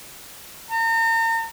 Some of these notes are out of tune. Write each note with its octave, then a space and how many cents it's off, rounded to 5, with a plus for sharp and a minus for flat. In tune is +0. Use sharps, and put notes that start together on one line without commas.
A#5 -40